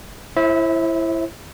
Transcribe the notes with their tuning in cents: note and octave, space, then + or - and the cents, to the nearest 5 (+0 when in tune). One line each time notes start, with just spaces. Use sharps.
E4 +15 C5 +40 E5 -25